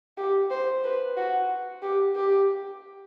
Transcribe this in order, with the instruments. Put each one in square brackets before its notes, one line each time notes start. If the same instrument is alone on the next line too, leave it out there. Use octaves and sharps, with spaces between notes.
[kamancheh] G4
C5
B4
F#4
G4
G4